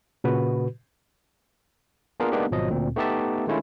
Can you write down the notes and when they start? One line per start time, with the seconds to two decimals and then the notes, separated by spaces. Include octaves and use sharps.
0.24 A#2 C#3 F#4 B4
2.20 A#3 B3 D4 F4 G#4 A#4
2.32 G#3 A#3 B3 D4 D#4 G4
2.51 G#1 B2 F3 F#3 D#5
2.70 D2 A#2 C4
2.96 A3 B3 D#4 G4 E5 A5
3.47 D#3 G#3 A3 C#4 E4 F4